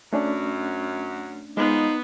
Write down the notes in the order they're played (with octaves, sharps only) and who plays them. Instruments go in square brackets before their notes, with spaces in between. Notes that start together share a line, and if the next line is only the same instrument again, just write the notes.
[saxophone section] F#2 [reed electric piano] A3 C#4 D4
[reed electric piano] G#3 [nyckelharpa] B3 [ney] D#4 [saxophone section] F4 B4 C5